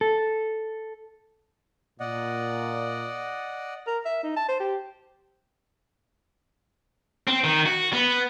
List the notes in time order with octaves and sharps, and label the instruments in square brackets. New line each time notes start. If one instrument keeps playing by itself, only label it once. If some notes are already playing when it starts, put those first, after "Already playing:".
[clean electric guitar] A4
[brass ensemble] A#2 [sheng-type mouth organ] D5 D#5 F#5
[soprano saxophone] A#4
E5
D#4
A5
C5
G4
[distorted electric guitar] C4
D#3
F#4
B3